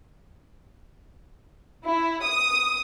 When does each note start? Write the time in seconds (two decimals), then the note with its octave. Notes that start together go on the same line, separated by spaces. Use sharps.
1.85 E4
2.24 D#6